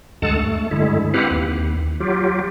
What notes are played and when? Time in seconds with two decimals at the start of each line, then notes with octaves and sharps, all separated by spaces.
0.22 D2 G2 G#3 A4 F#5 A5
0.37 A3
0.71 G2 D3 G#3 E4
1.14 C4 E4 G4 B4 F5 F#5
1.31 D#2
2.00 F#3 F4 G4